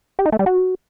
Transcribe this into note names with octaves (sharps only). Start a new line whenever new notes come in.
G4
D#4
A3
G3
F#4